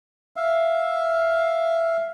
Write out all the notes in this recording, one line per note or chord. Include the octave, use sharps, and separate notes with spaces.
E5 F5